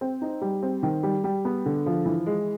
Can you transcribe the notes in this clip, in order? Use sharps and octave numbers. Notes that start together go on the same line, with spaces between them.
C4
D#4
G3
C4
D#3
G3
G3
B3
D3
F3
E3
G#3